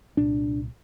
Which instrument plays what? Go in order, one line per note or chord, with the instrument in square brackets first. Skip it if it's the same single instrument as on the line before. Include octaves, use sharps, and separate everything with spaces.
[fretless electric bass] C2 A#2 D4